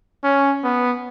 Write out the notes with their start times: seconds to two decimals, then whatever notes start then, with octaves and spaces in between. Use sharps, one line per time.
0.24 C#4
0.64 B3